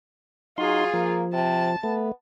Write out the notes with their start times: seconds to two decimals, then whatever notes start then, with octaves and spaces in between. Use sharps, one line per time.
0.58 F#3 D#4 F4 G#4 C6
0.94 F3 A#3
1.33 C3 A5
1.83 A3 B3